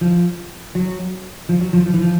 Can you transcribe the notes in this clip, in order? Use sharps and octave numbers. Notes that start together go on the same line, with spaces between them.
F3
F#3
F3
F#3
F3
F3
E3
F3